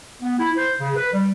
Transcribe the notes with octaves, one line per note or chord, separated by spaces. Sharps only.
B3
E4
C5
C#3
B4
G3